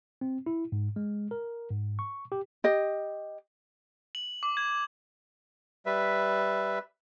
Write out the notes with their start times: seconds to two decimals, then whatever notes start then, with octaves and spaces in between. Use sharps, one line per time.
0.21 C4
0.46 E4
0.72 G#2
0.96 G#3
1.31 A#4
1.71 G#2
1.99 C#6
2.32 G4
2.64 G4 D#5
4.15 F#7
4.43 D6
4.57 G#6
5.86 G3 B4 E5